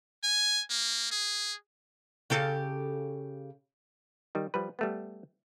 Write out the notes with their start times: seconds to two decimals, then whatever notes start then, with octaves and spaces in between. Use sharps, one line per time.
0.23 G#5
0.70 A#3
1.11 G#4
2.30 C#3 G4 A4
4.35 D#3 G3
4.54 F3 G3 B4
4.79 G3 A3 B3